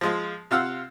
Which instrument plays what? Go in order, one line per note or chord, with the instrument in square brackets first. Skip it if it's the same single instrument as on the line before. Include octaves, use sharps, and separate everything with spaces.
[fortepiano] F3 G#3 F4
C3 F4 F5 F#5 E6